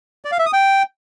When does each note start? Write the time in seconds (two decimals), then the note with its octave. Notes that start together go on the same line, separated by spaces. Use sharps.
0.25 D5
0.32 F5
0.39 E5
0.46 D#6
0.53 G5